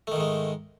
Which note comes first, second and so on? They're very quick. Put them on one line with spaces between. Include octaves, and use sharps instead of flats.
A3 D#3 G#2 G#3